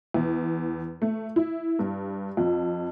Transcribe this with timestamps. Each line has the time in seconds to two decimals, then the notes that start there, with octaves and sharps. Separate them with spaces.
0.14 E2
1.02 A3
1.36 E4
1.79 G2
2.37 F2